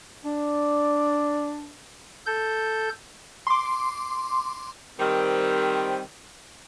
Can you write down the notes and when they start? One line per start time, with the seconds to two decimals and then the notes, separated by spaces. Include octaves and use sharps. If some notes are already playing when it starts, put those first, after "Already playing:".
0.25 D4 D5
2.26 A4 G6
3.47 C6 D6
4.99 D#3 G3 C4